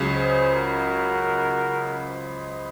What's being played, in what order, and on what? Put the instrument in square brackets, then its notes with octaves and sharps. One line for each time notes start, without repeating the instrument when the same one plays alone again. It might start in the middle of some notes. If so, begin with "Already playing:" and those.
Already playing: [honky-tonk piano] C#2 C#3 F#3 C#4
[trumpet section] G#4 C5
F#4 A#4
C5 D#5